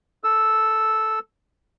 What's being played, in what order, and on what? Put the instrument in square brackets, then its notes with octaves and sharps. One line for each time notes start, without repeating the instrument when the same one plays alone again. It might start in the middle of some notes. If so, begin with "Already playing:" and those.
[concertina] A4 E6